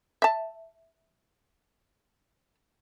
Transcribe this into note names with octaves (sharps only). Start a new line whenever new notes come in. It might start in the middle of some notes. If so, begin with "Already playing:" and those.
E5 A5